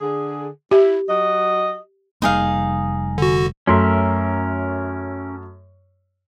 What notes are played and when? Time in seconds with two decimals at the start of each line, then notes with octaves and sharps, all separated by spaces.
0.01 D3 G#4
0.71 E4 G4
1.08 F#3 F#4 D#5
2.22 F1 G3 A#3 D#4 G#4 F5
3.18 D3 F#4
3.67 F#2 A3 C#4 A#4 E5 C6